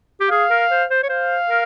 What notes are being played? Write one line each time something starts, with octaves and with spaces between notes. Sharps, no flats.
G4
G#4 F5
A#4
C5
C5
C#5
C5 F5
A#4